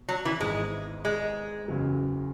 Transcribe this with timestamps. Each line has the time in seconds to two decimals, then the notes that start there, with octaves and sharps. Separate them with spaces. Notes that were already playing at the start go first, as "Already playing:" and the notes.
Already playing: B2
0.09 F#3
0.25 E3
0.40 G#1 G#2 E3 G#3 B3
1.05 G#3
1.68 F#1 E2 C#3 F#3